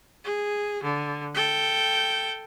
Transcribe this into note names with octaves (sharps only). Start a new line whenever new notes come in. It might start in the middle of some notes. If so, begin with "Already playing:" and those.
G#4
D3
A4 G5